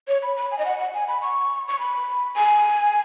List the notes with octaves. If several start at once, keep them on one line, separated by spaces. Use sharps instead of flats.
C#5
B5
B5
G#5
D#5
F#5
F#5
G#5
B5
C#6
C#6
B5
G#5